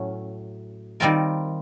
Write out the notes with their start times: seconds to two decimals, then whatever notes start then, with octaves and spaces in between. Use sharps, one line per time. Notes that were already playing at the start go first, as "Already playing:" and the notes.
Already playing: A2 F#3 A3 C#4
1.00 D#3 G3 C4 F4 A#4